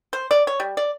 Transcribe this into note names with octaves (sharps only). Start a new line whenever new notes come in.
C5
D5
C#5
G3
D5